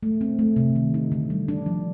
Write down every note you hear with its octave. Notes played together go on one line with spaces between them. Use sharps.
A3
C4
A3
C3
D#3
D#4
D3
G3
D4
F3